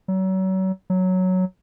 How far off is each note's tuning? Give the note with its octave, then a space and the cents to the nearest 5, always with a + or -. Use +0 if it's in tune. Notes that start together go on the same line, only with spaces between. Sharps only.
F#3 +35
F#3 +0